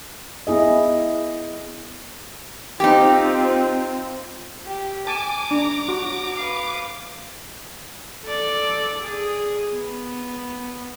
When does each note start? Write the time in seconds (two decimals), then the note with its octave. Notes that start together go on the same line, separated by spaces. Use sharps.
0.47 B3 E4 G#4 D#5
2.80 C4 D#4 F4 G4
4.65 G4
5.07 G#5 A5 D6
5.51 D4 A#5
5.89 F#4
6.35 B4 F5
8.23 A4 D5
9.01 G#4
9.73 B3